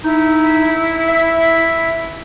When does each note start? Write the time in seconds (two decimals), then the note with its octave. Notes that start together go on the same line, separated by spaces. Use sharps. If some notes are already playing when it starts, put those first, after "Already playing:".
0.04 D#4 E4
1.08 E5